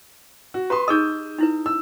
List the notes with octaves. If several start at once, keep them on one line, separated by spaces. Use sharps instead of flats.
F#4
G4 B4 A#5 C6 D#6
D#4 G#4 D#5 D#6 E6 G6
D#4 E4 B4
E6